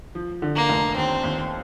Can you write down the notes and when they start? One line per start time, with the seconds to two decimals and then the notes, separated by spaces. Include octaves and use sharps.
0.15 F3
0.42 D3
0.56 A#3
0.69 F1
0.96 D#2 C4
1.24 D#2